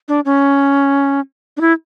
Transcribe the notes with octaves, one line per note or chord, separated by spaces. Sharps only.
D4
C#4
D4
E4